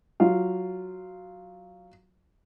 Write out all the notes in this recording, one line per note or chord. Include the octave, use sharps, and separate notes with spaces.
F#3 F4 F5